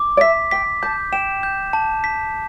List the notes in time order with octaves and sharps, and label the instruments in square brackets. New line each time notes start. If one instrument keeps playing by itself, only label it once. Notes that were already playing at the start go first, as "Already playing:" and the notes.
Already playing: [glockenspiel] D6
[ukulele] D5
[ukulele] E5 [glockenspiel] B6
[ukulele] G5 [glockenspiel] B6
[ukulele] A5 [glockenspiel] G6
[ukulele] G5 [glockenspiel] E7
[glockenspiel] G6
A5
B6